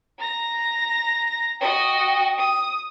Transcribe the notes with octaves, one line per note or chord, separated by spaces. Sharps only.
A#5 A#6
F#4 D#5 G5
D#6